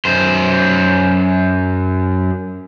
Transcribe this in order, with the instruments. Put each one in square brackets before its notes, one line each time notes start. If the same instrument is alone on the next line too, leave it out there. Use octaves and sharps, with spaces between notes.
[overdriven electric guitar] F#2 C5